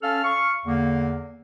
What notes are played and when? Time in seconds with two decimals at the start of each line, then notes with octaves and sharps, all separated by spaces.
0.03 C#4 A4 F5 A5 F6
0.24 F5 C#6
0.66 E2 D3 A#3